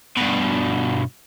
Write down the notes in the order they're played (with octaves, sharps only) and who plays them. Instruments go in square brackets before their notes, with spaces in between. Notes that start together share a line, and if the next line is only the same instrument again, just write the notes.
[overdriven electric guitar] G2 B2